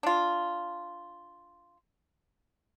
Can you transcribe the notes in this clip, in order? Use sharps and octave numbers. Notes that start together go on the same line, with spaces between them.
D4 F4